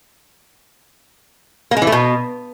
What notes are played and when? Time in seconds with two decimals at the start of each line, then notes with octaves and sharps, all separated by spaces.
1.71 A#3
1.77 G#3
1.82 E3
1.87 A3
1.92 B2